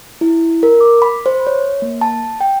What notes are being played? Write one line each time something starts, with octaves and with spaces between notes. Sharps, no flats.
E4
A#4
D6
B5
C5
C#5
A#3
A5
G5